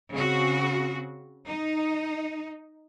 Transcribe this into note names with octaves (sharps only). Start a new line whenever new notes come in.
C#3 C4 F#4
D#4